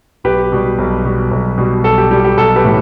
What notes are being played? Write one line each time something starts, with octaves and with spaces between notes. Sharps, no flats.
B1 G4 B4
B2 G3
B1
B2 G3
B1
B2 G3
B1 A4
G4
B2 G3 G4
G4
B1 A4
G4 B4
A2 E3